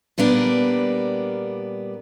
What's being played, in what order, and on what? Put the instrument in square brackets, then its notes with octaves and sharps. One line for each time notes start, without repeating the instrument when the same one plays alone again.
[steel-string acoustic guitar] A#2 G3 B3 D4 A#4